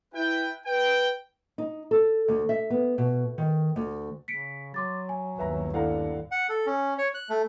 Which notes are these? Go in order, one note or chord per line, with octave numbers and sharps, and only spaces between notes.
E4 B4 G5
B4 G5
D#4
A4
D2
E5
B3
B2
D#3
D2
C#3 B6 C#7 D7
F#3 C6 D6 A6
G#5
G1 D#2 B4 E5 A#5
D4 E4 A4 D5 F5 F#5 A#5
F#5
A4
C#4
C#5
F#6
A3